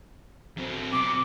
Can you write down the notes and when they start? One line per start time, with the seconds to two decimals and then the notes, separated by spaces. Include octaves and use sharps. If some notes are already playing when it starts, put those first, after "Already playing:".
0.57 F#3 C4
0.93 B2 C4 D6